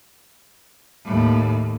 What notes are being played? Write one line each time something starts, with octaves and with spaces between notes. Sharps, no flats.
D#2 A2